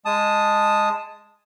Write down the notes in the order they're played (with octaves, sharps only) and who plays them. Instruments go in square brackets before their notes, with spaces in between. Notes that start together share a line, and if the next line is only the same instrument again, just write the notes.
[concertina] G#3 A5 D#6